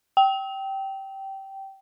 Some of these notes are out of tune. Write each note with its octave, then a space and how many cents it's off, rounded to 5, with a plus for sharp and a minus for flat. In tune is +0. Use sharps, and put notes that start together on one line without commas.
G5 -15